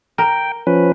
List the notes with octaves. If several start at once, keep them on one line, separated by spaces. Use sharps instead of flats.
A#4 G5
F3 C#4 B4